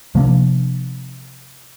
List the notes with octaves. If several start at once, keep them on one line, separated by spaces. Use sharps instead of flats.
C3 F3 A#3 D4